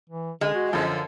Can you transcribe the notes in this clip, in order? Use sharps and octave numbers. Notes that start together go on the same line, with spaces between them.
E3
D3 G#3
F#4
F#2 D3 F3